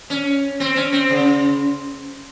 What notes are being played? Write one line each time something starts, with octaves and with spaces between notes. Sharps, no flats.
C#4
C4
C#4
C4
C#3